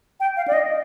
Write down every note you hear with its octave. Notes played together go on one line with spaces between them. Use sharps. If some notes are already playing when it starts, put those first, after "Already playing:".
G5
F5
D5
D#5